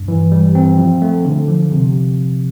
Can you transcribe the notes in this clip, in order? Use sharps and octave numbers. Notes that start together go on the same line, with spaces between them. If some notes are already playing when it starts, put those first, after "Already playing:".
Already playing: G2
E3
G3
C4
F3
A3
D3
F3
C3